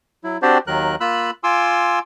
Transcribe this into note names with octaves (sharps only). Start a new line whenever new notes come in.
F#3 E4
C4 D4 F#4 G4 C5 D5
D#2 D#3 F#3 A#4 F#6
A#3 F4 B5 E6 F#6
F4 G#5 C6 D6 E6